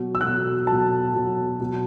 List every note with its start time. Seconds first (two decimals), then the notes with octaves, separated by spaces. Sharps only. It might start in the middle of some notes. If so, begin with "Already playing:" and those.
Already playing: B2 F#3
0.15 E6
0.21 B2 F#3 F#6
0.67 B2 F#3 A5
1.14 B2 F#3
1.60 B2 F#3